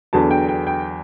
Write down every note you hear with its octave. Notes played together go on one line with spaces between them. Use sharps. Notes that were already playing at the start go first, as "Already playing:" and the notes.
E2 D3 F#3 A5
G5
G5
G5